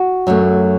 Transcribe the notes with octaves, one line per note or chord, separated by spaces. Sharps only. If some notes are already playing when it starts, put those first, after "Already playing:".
Already playing: F#4
F#2 F#3 A3